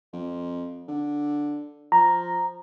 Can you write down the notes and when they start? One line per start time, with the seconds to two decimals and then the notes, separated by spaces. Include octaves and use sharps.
0.13 F2
0.88 D3
1.92 F3 A#5